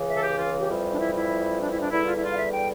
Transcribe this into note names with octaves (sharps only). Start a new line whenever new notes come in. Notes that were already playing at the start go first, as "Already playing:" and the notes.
Already playing: C#2 C#3 E3
E5
A4
G4
F4
G4
F2 E3 G3
D4
E4
E4
D4
E4
D4
E2 D3 G3 E4
F4
E4
F4
F5
E5
G5